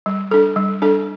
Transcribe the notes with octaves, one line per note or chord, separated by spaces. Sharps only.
G3
D4 A4
G3
D4 A4